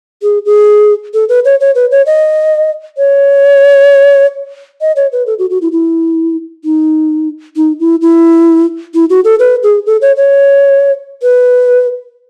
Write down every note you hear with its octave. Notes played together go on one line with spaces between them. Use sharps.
G#4
G#4
A4
B4
C#5
C#5
B4
C#5
D#5
C#5
D#5
C#5
B4
A4
F#4
F#4
E4
E4
D#4
D#4
E4
E4
E4
F#4
A4
B4
G#4
A4
C#5
C#5
B4